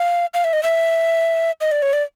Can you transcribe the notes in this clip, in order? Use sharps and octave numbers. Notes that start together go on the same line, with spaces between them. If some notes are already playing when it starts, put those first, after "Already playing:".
Already playing: F5
F5
E5
D#5
E5
D#5
D5
C#5
D5